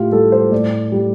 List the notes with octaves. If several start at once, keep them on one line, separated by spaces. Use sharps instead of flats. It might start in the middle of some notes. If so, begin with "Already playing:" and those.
Already playing: A2 F4 G4
G3 A4
C5
A2 D5
G3